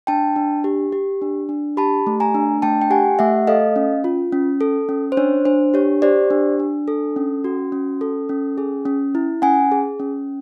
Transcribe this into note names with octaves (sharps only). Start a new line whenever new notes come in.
D4 G5 A5
D4
G4
G4
D4
D4
G4 A5 B5
A3
G#5 A#5
D4
A3 G5 A5
G5
G4 F#5 G#5
A3 E5 F#5
A4 D#5 F5
C#4
F4
C#4
A4
C#4
C5
D4 C#5
D4 C5
G4 C#5
G4 C5 D5
D4
D4
A4
C#4
F#4
C#4
A4
C#4
G#4
C#4
E4
C#4 F#5 G#5
G#4
C#4